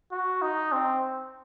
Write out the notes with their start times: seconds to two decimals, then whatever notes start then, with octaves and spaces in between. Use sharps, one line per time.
0.12 F#4
0.42 D#4
0.72 C4